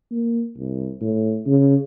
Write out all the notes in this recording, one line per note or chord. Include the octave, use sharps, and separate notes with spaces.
A#3
C2
A2
C#3